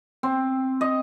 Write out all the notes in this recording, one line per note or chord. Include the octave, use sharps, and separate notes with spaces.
C4
D#5